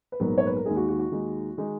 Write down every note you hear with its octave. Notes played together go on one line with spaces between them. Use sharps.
B4
A#1 G#2 F#3 B3 A#4
C#5
B4
A#4
D#2 D#3 G#3 D#4 G#4
F#4
F#4
F#4
D#2 D#3 G#3 D#4
D#3 G#3 D#4